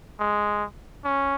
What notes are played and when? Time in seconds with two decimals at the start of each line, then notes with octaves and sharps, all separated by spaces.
0.19 G#3
1.05 C#4